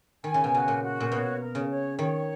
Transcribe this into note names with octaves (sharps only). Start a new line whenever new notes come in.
D#3 G#5
C#3
B2
C#3 F#4
A#2
F#4
A#2
B2 C#5
A#4
C#3
C#5
D#3 C#5